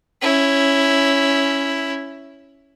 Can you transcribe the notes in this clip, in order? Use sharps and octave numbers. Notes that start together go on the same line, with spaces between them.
C#4 E4